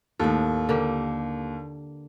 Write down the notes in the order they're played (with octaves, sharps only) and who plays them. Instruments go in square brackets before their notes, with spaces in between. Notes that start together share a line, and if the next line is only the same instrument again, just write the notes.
[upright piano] D#2 [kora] A2 A4
[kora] D3 A#3 G4